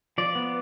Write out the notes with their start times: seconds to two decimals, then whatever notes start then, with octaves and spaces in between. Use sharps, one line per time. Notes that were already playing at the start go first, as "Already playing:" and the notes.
0.18 F3 D5
0.35 B3